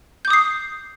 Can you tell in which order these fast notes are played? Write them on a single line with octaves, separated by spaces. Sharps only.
G6 D6 D#6 C7